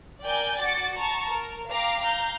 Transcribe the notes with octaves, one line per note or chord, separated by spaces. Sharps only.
A#4 D5 G5 G#5 G6
F#4 D6 A6 C#7
A5 A#5 C#6
A#4
F5 G5 A#5 D6 C7
F5 A#5 G6